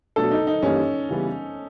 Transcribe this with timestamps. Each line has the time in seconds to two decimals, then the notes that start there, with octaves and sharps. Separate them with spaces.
0.16 B2 F#3 A3 D4 A4
0.31 D#4
0.47 D#4
0.62 G2 E3 G3 A#3 C#4 D#4
1.09 C#3 E3 G3 B3